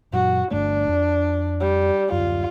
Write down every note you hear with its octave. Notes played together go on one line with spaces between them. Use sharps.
F#2 A#2 F#3 F#4
G1 G2 A3 D4
F2
G3
D1 F#2 F4